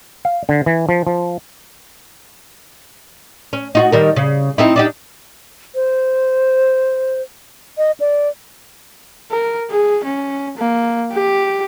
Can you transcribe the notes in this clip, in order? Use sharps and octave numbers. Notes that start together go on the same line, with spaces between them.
F5
D3
E3
F3
F3
C#4
D#4 F4 F#4
D#3 G3 A#4
C#3
C4 D#4 E4
D4 D#4 G4
C5
D#5
D5
A#4
G#4
C#4
A#3
G4